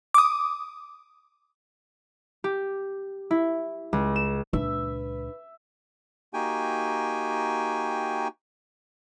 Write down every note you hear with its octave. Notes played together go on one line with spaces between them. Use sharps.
D6 D#6
G4
E4
C#2
E7
C#2 A#2 G#3 D4 B4 E5
A#3 D#4 F#4 G4 G5 G#5